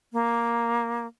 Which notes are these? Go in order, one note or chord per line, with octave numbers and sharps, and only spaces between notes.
A#3